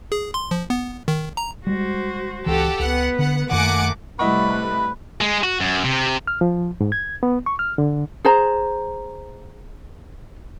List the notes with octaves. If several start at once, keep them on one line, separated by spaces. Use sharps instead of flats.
G#4
C6
F3
B3
D#3
A#5
G3 G#3 F#4 C5
C#2 E3 G4 A4 F#5
C#2 B3 B4 F#5
D3 F#5
F#2 D#3 A3 A#3 F#5 G#5 D6
C3 G3 A3 E4 B4 D#5 F#5 C#6
B5 F#6
G#3
F#4
F#2
C3
F6
F3
G#2
G#6
B3
C#6
F6
D3
G#4 C5 A#5